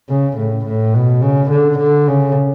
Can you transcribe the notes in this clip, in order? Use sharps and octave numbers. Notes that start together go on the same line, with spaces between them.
C#3
A2
A2
B2
C#3
D3
D3
C#3